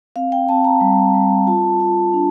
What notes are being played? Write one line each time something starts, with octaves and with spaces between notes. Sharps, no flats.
C4 F5
G5
C4 A5
A#5
G3
G3
F4 A5
F4
D4